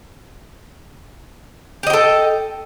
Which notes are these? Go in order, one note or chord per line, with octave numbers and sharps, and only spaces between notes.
G4 A4 D#5 G5